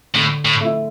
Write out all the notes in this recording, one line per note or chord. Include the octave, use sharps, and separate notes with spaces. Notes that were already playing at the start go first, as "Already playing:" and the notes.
A2 D3
A2
A3 E4